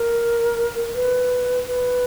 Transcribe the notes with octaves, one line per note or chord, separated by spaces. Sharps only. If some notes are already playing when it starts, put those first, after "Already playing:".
Already playing: A#4
B4
B4